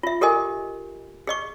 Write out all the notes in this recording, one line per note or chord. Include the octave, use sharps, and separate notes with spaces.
F4 E5
G4 A4 A#4 D#5 G#5
G#4 D#5 C#6